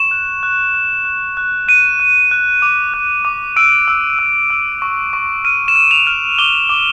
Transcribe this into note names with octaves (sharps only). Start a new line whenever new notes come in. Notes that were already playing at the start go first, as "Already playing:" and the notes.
Already playing: C#6 E7
F#6
F#6
F#6
F#6
F#6
F#6 D#7
F#6
F#6
D6
F#6
D6
E6 D7
E6
E6
E6
C#6
C#6
F6 D#7
E7
F6
F7
F6
D6 G7
D6